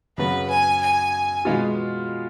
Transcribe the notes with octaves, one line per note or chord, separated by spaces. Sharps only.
F#2 C#3 F#3 B3 F#4 B4
G#5
G#5
B2 G#3 B3 F4